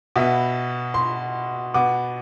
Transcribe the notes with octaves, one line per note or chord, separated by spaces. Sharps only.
B2 B3 E5
C6
B2 B3 D6